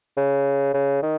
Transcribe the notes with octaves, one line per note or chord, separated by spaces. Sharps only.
C#3
C#3
D#3